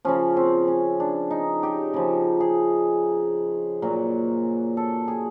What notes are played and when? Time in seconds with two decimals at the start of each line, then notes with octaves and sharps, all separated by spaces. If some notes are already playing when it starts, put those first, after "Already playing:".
0.05 C#3 F3 C#4
0.37 C4
0.68 C#4
1.00 D4
1.31 D#4
1.63 G4
1.94 C#3 F3
2.40 G#4
3.82 A#2 F#3
4.77 A4
5.08 G#4